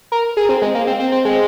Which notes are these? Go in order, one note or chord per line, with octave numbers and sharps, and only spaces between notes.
A#4
G#4
C4
G#3
A#3
C4
C4
C4
G#3